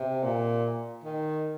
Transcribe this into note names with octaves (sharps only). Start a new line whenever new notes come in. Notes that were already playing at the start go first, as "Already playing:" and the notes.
Already playing: C3
A#2
D#3